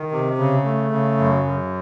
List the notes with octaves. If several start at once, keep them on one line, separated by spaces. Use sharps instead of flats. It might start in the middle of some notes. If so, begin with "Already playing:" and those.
Already playing: D#3
C3
C#3
A3
C#3
F#2
F#2